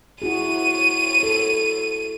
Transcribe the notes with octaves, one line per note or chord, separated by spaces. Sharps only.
E4 F#4 G#4 D#7
A4